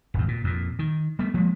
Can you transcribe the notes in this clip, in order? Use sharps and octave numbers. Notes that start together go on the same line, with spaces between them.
D#1 G#1 F#2
A#2
F2 A#2
D#3
G3 A3 B3
F3 G#3 A#3